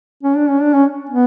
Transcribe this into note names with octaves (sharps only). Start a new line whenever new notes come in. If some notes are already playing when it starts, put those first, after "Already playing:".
C#4
D4
C#4
D4
C#4
B3